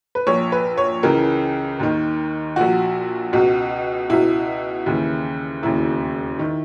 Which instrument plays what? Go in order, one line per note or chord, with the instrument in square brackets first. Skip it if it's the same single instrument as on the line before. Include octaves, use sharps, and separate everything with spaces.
[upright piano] B4
A#1 A#2 C#5
B4
C#5
C#2 C#3 E3 A#4
D#2 D#3
A#1 A#2 F#4
C#2 B2
C#2 B2 E4
D#2 C#3 E3
E1 D#2 C#3 E4
D#3